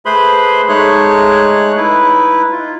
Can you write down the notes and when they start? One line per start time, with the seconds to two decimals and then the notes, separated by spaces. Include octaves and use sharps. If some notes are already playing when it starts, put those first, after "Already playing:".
0.05 A3 G#4 B4 C5 B5 C6
0.69 G#3 A3 D#4 G#4 C#5 F#6
1.77 D#4 E4 B4
2.52 F4